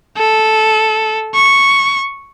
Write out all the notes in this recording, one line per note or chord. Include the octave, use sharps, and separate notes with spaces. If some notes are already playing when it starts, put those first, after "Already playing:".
A4
C#6